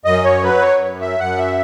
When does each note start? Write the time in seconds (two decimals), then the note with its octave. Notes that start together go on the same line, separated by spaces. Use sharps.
0.05 F#2 D#5
0.24 C#5
0.43 F#3 B4
0.62 C#5
0.81 F#2
1.00 E5
1.19 F#2 F#5
1.38 E5